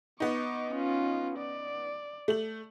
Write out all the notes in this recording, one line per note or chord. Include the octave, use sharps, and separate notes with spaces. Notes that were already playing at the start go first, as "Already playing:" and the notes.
B3 D#4 C#6 D6
C#4 F4
D5
A3 F#7